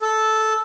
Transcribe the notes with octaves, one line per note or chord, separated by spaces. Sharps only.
A4